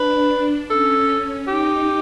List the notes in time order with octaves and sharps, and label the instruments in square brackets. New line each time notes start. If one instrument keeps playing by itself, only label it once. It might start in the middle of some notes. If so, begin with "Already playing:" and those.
Already playing: [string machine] D4 [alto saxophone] B4
[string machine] C#4 [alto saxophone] A4
[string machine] D#4 [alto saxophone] G4